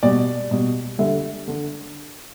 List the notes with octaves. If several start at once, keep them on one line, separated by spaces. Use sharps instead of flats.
B2 G3 D5
B2 G3
D3 G3 E5
D3